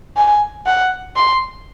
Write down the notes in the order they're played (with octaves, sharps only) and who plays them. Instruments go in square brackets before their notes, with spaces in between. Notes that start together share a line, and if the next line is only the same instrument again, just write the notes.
[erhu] G#5
F#5
C6